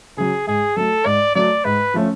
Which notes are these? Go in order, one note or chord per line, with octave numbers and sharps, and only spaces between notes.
C#3 F#3 G#4
G#2 G#4
F#3 A3 A4
G#2 D5
F#3 A3 D5
G#2 B4
F3 A3 C#4